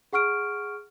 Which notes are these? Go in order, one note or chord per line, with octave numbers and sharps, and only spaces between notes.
G#4 F#5 C#6 F6 D7